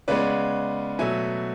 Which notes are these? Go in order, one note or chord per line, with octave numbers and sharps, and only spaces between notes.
C#3 G#3 B3 B4 D5
B2 F#3 A3 E5 G#5